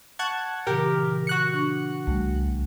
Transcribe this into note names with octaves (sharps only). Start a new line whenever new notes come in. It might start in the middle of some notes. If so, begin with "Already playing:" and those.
F#5 A5 C#6 G#6
A#2 C#3 E3 G4 A#4
F#4 F#6 C#7
D4 C#6
C2 G3 A3